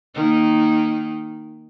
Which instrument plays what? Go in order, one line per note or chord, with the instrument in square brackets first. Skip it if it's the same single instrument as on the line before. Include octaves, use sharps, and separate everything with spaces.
[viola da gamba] D#3 A#3 D#4